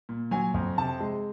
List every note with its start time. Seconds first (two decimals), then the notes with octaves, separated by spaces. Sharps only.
0.09 A#2
0.31 F#3 G#5
0.54 F2
0.77 C3 A5
1.00 G#3